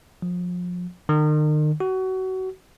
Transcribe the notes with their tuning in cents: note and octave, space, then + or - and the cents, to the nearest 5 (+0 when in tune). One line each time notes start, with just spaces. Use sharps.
F3 +30
D#3 -40
F#4 +25